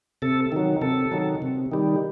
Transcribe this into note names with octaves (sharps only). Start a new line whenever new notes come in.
C3 A4
D#3 F#3
C3 A4
D#3 F#3
C3
D#3 G3